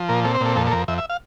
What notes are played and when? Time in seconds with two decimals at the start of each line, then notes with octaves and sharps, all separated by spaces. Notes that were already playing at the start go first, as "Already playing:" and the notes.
Already playing: F3
0.09 A#2 A#4
0.24 C4 A4
0.35 C5
0.41 A#2 A4
0.56 F2 A4
0.67 A4
0.72 F2 A#4
0.88 F2 E5
0.98 E5
1.10 F5